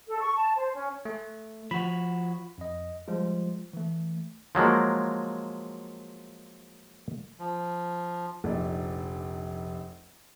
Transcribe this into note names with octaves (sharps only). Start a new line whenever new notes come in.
A4
C#6
A5
C5
C#4
A3
F3 F#4 B5
F2 D#5
F3 G3 G#3 F4
E3 A3
F3 F#3 G#3 A#3
F3
F1 A#1 D#4 D5